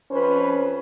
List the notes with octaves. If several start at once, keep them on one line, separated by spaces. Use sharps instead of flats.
F2 C#4 B4 C5